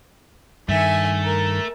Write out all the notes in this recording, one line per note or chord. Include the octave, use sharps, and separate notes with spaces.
G2 D#3 A3 E5 G#5
A#4